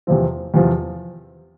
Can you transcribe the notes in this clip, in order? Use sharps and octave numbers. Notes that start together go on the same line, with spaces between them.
E2 C3 F3 C4
E2 C3 F3 C4